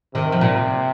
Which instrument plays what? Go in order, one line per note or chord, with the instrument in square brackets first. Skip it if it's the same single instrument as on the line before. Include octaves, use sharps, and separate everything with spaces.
[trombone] C3 [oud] D#3
[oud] F3
A#2